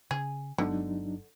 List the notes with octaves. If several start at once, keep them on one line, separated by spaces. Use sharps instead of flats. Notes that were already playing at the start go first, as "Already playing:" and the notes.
C#3 G#4
G1 D3 F#3 G#3 B3 D4 D#4